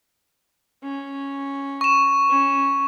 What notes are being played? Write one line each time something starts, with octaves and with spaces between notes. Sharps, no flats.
C#4
C#6 E7
C#4